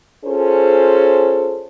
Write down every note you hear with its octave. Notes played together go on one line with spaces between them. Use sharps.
C#4 F4 G#4 A4 C5